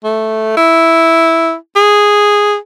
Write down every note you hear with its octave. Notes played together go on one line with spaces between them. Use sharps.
A3
E4
G#4